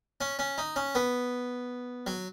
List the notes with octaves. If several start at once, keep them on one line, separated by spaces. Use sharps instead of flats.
C#4
C#4
D#4
C#4
B3
F#3